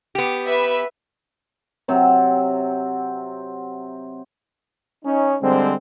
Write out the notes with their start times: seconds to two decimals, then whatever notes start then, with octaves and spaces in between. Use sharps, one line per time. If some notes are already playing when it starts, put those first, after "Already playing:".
0.15 B3 G4
0.46 B4 E5
1.88 C3 F#3 C4
5.05 C#4 D#4
5.42 D3 G3 G#3 C4